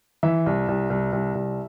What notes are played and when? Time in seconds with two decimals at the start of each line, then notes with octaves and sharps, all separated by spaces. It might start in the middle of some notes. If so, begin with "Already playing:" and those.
0.23 E3 E5
0.46 C2
0.68 C2
0.90 C2
1.13 C2
1.35 C2